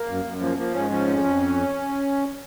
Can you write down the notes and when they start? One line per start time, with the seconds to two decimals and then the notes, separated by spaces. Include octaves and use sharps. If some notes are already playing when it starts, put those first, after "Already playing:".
Already playing: A#3
0.08 F#2
0.24 F#2
0.41 F3 A#3
0.57 F3 A#3
0.74 G#2 C#4
0.90 F3 C#4
1.07 F2
1.24 F2